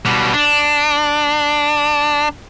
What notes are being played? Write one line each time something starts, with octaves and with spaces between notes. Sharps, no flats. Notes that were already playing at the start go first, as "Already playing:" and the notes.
B2 G3
D4